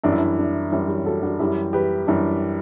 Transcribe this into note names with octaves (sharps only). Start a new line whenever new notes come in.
F#2 E3 G3 D4
E4
D4
D4
F#2 E3 G3 C#4 E4
E4 G4
F#4 A4
D4 F#4
F#2 E3 G3 E4 G4
G4 B4
F#2 E3 G3 D4